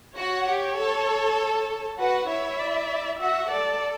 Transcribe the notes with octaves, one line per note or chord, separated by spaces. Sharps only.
F#4 C#5 F#5
G4
A4
F#4 B4 F#5
E4 C#5 E5
D5
F#4 E5 F#5
A4 D5